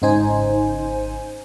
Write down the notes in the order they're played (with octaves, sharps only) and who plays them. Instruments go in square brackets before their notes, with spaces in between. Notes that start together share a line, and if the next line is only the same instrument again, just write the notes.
[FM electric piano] G#1 C#3 D#4 C5 G#5